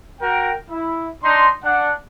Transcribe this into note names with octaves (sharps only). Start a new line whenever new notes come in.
F#4 A#4 G5
E4
D4 D#4 C6
D4 F#5